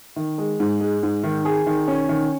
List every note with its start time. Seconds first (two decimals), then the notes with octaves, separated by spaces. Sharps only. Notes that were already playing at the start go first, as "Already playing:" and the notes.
0.16 D#3
0.38 G#3
0.60 G#2
0.81 G#3
1.03 G#2
1.24 D#3
1.45 G#4
1.67 D#3
1.88 C#4
2.09 D#3